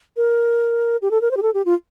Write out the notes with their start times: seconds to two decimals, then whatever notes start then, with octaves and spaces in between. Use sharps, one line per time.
0.17 A#4
1.02 G4
1.11 A4
1.21 A#4
1.31 C5
1.37 G4
1.42 A4
1.54 G4
1.66 F4